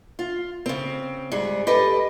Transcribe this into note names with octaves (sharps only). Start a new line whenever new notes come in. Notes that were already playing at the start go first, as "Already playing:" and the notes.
F4
C#3 C4
G#2 G3 G#4
G4 A4 B4 D#5